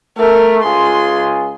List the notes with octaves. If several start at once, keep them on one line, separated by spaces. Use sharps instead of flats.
A3 A#4
C#2 F4 G#4 C6